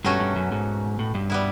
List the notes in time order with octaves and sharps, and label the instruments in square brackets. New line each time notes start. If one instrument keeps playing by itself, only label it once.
[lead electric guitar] G2 [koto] B2 F#3 A3 C#4 F#4
[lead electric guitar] G2
F#2
G#2
A2
G2
[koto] G3 B3 E4